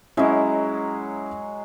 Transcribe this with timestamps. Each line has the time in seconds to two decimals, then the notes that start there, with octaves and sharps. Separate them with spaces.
0.17 F#3 G#3 C#4 E4 D#5